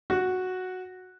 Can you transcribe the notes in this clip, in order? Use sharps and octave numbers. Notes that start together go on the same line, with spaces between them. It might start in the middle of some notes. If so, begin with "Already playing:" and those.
F#4 F#5